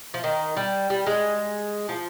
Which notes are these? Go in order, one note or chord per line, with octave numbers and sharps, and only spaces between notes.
F3
D#3
G3
G3
G#3
F3